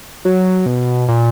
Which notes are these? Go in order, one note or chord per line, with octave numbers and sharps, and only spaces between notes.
F#3
B2
A#2